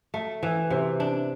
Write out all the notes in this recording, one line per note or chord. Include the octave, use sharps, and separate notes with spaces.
A3
E3
C3
D4